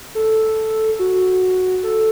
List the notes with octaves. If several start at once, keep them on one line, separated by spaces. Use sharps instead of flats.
A4
F#4
A4